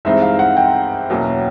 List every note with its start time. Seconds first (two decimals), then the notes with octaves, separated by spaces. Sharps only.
0.05 G2 E3 G#3 C4 D#4 E5
0.22 F5
0.39 F#5
0.57 G5
1.10 E2 B2 F#3 A#3 C#4